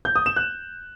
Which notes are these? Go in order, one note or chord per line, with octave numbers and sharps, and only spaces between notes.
G6
D#6
E7
F#6